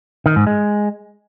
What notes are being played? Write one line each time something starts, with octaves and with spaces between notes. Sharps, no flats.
D#3
G#2
G#3